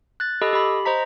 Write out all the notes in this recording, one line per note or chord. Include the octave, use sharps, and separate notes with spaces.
F#6 A6
G4 A4 D#5 B5 D#6 E6
G4 B5
C5 D#5 A#5 B6